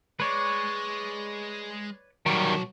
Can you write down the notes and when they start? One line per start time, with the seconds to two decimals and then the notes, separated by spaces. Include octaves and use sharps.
0.20 G#3 B4 C#5 D5
2.26 B1 D#3 F#3 G3 A5